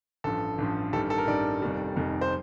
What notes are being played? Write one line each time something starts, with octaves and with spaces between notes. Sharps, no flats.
A1 G2 F3 A4
A1 G2 F3
A1 G2 D#3 G3 A4
A4
A#4
A1 G2 D#3 G3 D5
F1 F2 D#3 G3
F1 F2 D#3 G3
C5